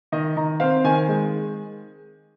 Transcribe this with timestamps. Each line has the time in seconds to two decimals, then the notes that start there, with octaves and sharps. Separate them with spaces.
0.12 D#3 D#5
0.36 D#3 A#5
0.60 C4 F5
0.84 D#3 G#5
1.08 G#3